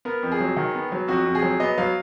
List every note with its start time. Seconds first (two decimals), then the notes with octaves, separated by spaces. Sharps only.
0.05 B3 A#4
0.23 F2
0.32 G#4
0.40 F#3
0.57 D#3
0.75 B3
0.92 F#3
1.08 F2 F#4
1.26 F2
1.35 G#4
1.43 F#3
1.60 B3 D#5
1.78 F#3 F5